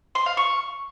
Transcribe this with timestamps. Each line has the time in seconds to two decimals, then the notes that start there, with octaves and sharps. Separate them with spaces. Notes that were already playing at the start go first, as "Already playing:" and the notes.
0.15 C6
0.26 F5
0.37 C#6